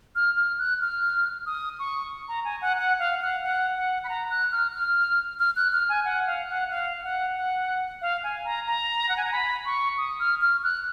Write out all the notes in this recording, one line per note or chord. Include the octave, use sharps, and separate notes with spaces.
F6
F6
F#6
F6
D#6
C#6
A#5
G#5
F#5
F#5
F5
F#5
F#5
F#5
B5
A#5
F#6
F6
F6
F6
F#6
F6
G#5
F#5
F5
F#5
F5
F#5
F#5
F5
G#5
A#5
A#5
F#5
G#5
A#5
B5
C#6
D#6
F6
F6
F#6